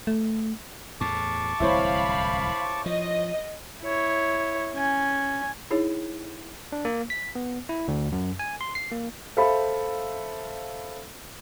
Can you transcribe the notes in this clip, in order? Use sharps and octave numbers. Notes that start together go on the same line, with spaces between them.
A3
E2 A2 A5 C#6 D6
D1 C2 E3 E4 C5 C#5 F5 B5
F3 D#5
E4 C#5
C#4 G#5
D#4 E4 G#4 C#5
D4
A#3
B6
B3
E4
D2
F#2
G#5
C6
C7
A#3
A4 C5 E5 F5 B5